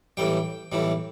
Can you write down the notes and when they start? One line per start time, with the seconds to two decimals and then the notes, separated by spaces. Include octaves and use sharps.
0.17 B1 A2 E3 G3 G5
0.72 B1 A2 E3 G3